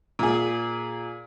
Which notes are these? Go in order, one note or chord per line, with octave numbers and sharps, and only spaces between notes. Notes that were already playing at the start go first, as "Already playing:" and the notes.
A#2 G#4